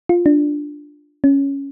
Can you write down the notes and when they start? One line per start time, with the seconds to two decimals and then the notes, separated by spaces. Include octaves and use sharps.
0.09 F4
0.26 D4
1.24 C#4